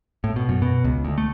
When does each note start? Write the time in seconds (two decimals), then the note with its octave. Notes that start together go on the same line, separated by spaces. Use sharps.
0.24 A2
0.36 B2
0.49 F#2
0.62 B2
0.84 C#2
1.05 D2
1.18 A3